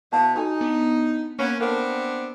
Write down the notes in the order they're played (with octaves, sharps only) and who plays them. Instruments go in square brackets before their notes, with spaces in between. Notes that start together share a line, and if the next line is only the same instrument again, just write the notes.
[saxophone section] B2 [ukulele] E4 F5 A5
[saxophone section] D#4 [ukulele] F4 A4 G#5 [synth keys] F#4
[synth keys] B3 [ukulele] D4
[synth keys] A#3 [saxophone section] B3 C#4
[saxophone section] B3 C4 D4 [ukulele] A4 A#4 F5